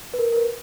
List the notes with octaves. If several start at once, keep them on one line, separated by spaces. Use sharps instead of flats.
B4
A#4
A#4
B4